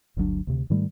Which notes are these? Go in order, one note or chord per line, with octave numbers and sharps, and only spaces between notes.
G1 D2 F#3 D4
D2 C3
G#2 D#3 G3 A3